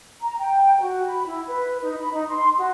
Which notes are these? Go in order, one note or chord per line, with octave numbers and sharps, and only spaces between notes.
A#5
G5
F#4
B5
E4
B4
D#4
B5
D#4
C6
F#4